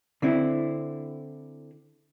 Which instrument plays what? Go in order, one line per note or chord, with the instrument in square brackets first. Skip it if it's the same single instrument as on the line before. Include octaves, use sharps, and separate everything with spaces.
[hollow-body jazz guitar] D3 C4 E4